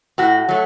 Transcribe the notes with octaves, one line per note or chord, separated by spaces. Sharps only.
A2 F#4
F#3 A3